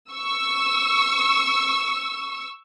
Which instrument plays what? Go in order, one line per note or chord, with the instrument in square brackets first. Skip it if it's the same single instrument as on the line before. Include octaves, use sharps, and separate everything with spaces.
[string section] C#6 E6